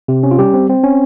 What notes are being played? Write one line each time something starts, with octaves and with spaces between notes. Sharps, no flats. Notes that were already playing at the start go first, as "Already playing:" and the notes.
C3
C#4
F4
G3 G4
C4
C4
C#4